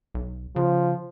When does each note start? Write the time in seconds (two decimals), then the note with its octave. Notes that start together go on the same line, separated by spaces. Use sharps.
0.14 B1
0.56 C#3 F3